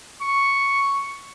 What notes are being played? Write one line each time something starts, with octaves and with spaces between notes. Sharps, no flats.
C#6